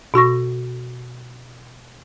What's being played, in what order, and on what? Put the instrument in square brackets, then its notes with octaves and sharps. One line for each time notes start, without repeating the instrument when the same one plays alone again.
[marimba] B2 F#4 C#6 A#6